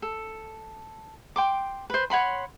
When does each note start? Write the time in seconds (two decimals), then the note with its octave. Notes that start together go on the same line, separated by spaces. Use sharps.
0.02 A4
1.36 G5 C6 D6
1.90 B4 C5
2.10 C#5 F#5 B5 C6